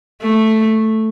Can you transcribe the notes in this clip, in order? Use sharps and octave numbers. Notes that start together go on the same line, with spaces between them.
A3